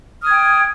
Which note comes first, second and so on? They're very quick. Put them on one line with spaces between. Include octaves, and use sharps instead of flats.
F6 D#6 G#6 G5